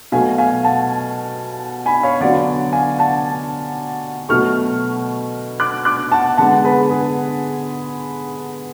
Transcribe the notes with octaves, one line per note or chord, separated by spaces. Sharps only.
B2 F#3 A3 F5 G#5
F5 G#5
F#5 A5
G#5 B5
C#5 F5
D3 F#3 B3 D5 F#5
F5 G#5
F#5 A5
B2 F#3 A3 C#6 F6
D6 F#6
D6 F#6
F#5 A5
D3 G#3 B3 F#5 A5
G#4 B4
G#4